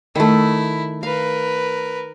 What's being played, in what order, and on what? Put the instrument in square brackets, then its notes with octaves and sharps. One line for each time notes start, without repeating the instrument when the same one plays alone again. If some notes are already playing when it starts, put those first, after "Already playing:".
[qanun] D#3 A3 [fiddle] E4
[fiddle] A#4 B4 [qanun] F5